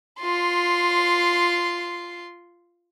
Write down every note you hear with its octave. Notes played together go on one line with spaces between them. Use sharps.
F4 C6